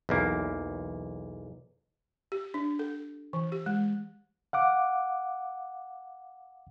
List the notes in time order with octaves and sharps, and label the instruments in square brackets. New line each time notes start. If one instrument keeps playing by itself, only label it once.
[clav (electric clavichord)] B1 E2 A#3
[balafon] G4
D4
A4
E3
G4
G#3
[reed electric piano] F5 F#5 D6